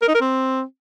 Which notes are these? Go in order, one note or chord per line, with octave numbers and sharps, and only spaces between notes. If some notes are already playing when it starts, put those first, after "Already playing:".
A#4
D#4
A#4
C4